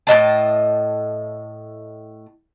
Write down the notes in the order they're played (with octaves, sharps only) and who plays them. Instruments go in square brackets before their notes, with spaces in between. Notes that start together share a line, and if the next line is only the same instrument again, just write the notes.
[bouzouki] A2 C3 D#5 A5